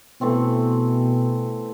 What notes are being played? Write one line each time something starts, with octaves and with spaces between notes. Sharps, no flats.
B2 E3 A3 C4